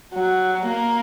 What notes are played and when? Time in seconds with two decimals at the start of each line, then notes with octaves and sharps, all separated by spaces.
0.14 F#3
0.67 A#3